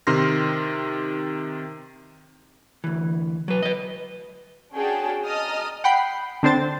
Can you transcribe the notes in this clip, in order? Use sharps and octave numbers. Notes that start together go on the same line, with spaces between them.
C3 D#3 C6 F6 A#6
D2 E3
F#3 B4
B4 D#5
C#4 D4 F#4 G#4 G5 A5
D#5 A5 A#5 D#6 F6
F#5 G5 B5 C7
D3 C4 D4 C5 A6